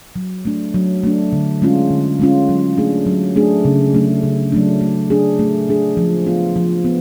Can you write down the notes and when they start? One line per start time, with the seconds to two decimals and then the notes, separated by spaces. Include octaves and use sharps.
0.16 F#3
0.45 A3 D4
0.74 F#3
1.03 A3 D4
1.33 D3
1.62 G#3 C#4 F4
1.91 D3
2.19 G#3 C#4 F4
2.49 F#3
2.78 A3 D4 G#4
3.06 F#3
3.36 A3 D4 G#4
3.65 C#3
3.94 F#3 A3 D4
4.23 C#3
4.52 F#3 A3 D4
4.81 A3
5.10 D4 G#4
5.39 A3
5.69 D4 G#4
5.97 F3
6.27 B3 F4
6.56 F3
6.85 B3